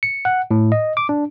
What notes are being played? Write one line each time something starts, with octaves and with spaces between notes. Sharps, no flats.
C#7
F#5
A2
D#5
D6
D4